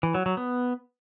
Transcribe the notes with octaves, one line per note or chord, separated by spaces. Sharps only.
E3
F#3
F#3
B3